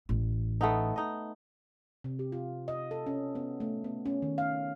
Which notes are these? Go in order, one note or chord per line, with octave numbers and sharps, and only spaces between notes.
A1
A3 B3 D#4
D#4 D#5
C3
G4
F4
D#5
A4
C#4
B3
A3
B3
C#4
D#3
F5